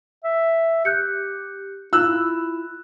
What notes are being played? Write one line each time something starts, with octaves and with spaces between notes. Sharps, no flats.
E5
G4 F#6 G6 C#7
D#4 F4 E6 F#6
E4